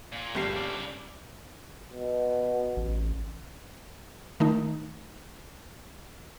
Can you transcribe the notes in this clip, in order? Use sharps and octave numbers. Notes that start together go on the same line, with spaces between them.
A#2
G1 G3 C7
C#3 D5
B2
A1
D#3 A3 D#4